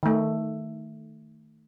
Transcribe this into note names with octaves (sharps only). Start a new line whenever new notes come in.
D#3 A3